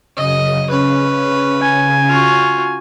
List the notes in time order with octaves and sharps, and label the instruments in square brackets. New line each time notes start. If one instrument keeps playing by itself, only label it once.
[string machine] F#2 C#3 [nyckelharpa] D#5
[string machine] C#3 [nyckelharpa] C#4 B4
[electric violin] G#5
[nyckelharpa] F4 F#4